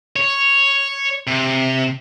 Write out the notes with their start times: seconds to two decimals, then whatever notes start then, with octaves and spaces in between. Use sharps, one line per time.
0.16 C#5
1.27 C3